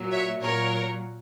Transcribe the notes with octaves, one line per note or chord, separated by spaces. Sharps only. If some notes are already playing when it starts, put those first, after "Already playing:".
Already playing: A#2 F#3
C#5 E5
A#2 F#3 A#4 C#5